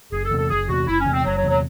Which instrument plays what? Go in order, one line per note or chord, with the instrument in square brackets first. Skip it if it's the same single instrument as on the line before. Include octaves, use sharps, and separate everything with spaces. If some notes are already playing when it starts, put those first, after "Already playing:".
[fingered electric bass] F#1 [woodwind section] G#4
[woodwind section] A4
[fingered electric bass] E2 C3
[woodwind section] A4
[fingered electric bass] F#1 [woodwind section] G#4
[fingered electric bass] E2 C3 [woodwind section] F#4
[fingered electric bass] F#1 [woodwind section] E4
[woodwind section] C#4
[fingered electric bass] E2 C3
[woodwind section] C4
[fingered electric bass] F#1 [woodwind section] F#3
[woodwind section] F#3
[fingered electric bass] E2 C3
[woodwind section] F#3